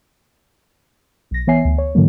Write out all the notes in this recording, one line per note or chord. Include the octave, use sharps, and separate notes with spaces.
B1 A#6
E3 B3 C#5 E5 G#5 C7
D2
C#5
G#2 D3 E3 F#3 A#3